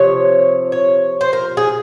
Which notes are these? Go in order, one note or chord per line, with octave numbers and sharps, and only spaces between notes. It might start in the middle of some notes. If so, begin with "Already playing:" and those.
Already playing: C3 F3 C#5
C#5
C5
A#4
G#4